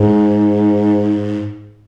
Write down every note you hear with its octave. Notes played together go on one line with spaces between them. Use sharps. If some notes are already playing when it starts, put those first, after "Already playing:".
Already playing: G#2